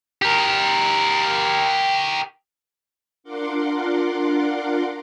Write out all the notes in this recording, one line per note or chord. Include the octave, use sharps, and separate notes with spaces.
G4 A#4
D4 F4 A#4 F#5 C6 D6